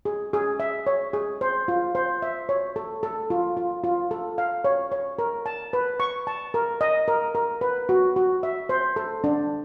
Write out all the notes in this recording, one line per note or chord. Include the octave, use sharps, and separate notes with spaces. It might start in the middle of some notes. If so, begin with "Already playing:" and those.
G#4
G#4
E5
C#5
G#4
C5
F4
C5
E5
C#5
A4
A4
F4
F4
F4
A4
F5
C#5
C#5
A#4
A5
B4
C#6
A5
A#4
D#5
A#4
A#4
B4
F#4
F#4
E5
C5
A4
D4